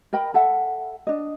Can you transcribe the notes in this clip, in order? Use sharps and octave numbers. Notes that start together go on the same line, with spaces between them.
A#4 D#5 G5 B5
A4 E5 F#5
D4 D#5